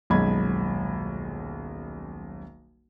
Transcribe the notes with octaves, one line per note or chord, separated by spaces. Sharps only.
D#1 B1 F#2 G#3 B5 G#6